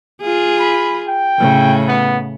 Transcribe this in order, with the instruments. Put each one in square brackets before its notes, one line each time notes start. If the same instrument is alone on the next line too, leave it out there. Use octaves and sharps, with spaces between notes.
[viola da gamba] F4 G#4
[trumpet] B5
G5
[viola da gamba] A2 C#3
[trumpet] B3